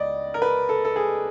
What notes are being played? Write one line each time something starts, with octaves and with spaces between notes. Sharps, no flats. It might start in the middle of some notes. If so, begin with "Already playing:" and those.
Already playing: C#2 C#3 D5 D#5
A#4
B4
A4
A4
G#4